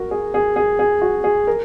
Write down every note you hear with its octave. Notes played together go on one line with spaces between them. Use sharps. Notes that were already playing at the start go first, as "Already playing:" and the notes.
Already playing: F#4 A#4
G#4
G#4
G#4
G#4
F#4
G#4
A#4